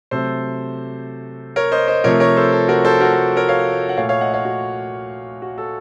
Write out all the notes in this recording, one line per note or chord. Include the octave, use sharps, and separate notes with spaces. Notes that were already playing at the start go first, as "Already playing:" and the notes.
C3 F#3 A3 A4 C5
A#4 C#5
C5 D#5
C5 D#5
C3 F3 A3 A#4 C#5
A#4 C#5
A4 C5
A4
F#4 A#4
A4 C5
F#4 A#4
A4
A#4 C#5
C#5 F5
F#5
A#2 A3 C#5 F5
C#5 F5
D#5 F#5
C#5 F5
F#4
F#4
A4